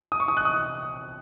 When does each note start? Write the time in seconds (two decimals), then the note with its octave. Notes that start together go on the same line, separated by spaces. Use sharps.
0.12 D#6
0.20 C#6
0.28 D#6
0.37 F#6
0.45 D#6